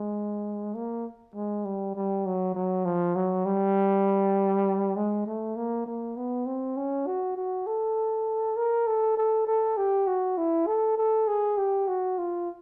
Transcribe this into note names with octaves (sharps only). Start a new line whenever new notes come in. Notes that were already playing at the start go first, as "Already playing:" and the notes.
Already playing: G#3
A#3
G#3
G3
G3
F#3
F#3
F3
F#3
G3
G#3
A3
A#3
A#3
B3
C4
C#4
F#4
F#4
A4
A#4
A4
A4
A4
G4
F#4
E4
A4
A4
G#4
G4
F#4
F4